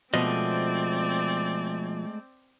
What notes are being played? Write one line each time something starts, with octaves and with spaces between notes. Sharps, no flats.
B2 F3 G#3 A3 C4 D5 D#5